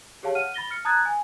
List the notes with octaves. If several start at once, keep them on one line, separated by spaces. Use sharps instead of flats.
G4 G#4 C#5 F5 A5
F#5 F6 D#7
B5 A6 A#6 G7
F6 C#7
A5 A#5 D#6 F#6 G#6 A6
G#5